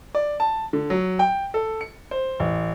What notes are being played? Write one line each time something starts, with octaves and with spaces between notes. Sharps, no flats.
D5
A5
D3
F#3
G5
A4
C#7
C5
A1